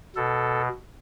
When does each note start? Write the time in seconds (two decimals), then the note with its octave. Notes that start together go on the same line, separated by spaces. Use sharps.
0.16 B2 A4